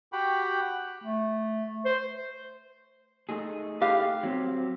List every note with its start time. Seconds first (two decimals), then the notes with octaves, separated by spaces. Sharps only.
0.13 F#4 G4 F#5 G5 B5
1.04 A3
1.85 C5
3.29 A3 D#4 G#4
3.82 G4 F5
4.23 F#3 C4